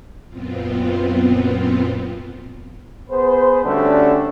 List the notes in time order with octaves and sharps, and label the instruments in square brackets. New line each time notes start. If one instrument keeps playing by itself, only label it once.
[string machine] F#2 A#2 B3 C4 F4
[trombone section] B3 G#4 B4 C5
D3 G3 A3 C#4 D4 F#4